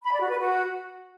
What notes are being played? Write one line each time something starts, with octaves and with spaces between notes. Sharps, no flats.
B5
D5
F#4
B4
F#4